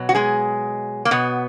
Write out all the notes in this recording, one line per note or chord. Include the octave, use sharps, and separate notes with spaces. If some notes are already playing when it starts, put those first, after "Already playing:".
Already playing: B2 F#3
F#4
G#3 G#4
A#3
B2 B3